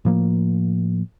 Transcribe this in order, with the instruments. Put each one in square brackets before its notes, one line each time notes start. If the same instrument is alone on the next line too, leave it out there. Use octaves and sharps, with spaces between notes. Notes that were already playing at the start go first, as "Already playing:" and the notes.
[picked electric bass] A2 F3 A#3